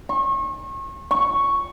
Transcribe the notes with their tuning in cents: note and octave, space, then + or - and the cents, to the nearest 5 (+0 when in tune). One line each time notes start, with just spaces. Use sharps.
C#6 -35
C#6 +0